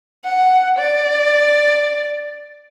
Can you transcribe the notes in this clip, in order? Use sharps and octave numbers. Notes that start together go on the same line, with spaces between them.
F#5
D5